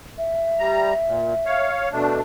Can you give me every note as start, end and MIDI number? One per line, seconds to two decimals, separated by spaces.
0.18 1.69 76
0.59 0.94 55
0.59 0.94 82
1.07 1.34 46
1.46 1.89 73
1.46 1.89 77
1.92 2.21 47
1.92 2.21 57
1.92 2.21 62